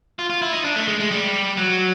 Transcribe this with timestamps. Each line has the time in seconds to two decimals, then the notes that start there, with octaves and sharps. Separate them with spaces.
0.19 F4
0.30 F4
0.42 E4
0.53 D#4
0.64 D4
0.76 A3
0.88 G#3
1.00 G#3
1.11 G3
1.57 F#3